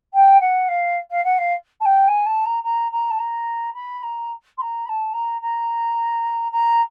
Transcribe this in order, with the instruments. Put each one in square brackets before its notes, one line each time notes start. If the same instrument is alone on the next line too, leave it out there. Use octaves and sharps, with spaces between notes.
[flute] G5
F#5
F5
F5
F#5
F5
A5
G5
G#5
A5
A#5
A#5
A#5
A5
A#5
B5
A#5
C6
A#5
B5
A5
A#5
A#5
A#5